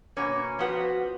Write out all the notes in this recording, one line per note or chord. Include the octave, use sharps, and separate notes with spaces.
B2 A#3 C#4
F3 B3 F#4